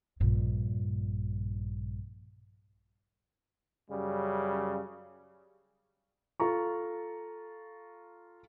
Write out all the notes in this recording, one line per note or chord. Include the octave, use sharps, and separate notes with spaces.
A#1 G2
F#2 C#3 G3
F4 A4 A#5 C#6